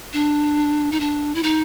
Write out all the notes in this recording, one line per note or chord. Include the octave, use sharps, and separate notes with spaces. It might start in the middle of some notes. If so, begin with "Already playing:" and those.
D4
D#4
D4
E4
D#4